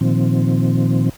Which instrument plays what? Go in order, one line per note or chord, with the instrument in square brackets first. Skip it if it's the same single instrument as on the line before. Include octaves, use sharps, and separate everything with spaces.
[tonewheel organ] A#2 D#3 F3 C4